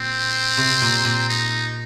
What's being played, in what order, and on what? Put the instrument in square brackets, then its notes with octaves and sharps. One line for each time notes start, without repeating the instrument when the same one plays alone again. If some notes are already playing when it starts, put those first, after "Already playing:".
Already playing: [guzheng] A#2 [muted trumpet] C4
[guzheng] C3
A#2
A#2
[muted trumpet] D#4